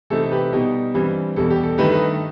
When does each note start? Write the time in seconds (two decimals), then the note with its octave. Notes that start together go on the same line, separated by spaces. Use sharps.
0.10 C3 E3 A3 C4 D#4 A4
0.23 A4
0.32 G4 B4
0.52 B2 G3 D#4 G4
0.94 G2 E3 G3 C4
1.36 E2 B2 G3 A4
1.50 G4
1.63 A4
1.78 G2 D#3 A3 D#4 G4 B4
1.91 B4 D#5